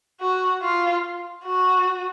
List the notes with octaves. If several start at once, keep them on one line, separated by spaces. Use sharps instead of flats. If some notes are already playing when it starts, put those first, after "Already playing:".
F#4
F4
F#4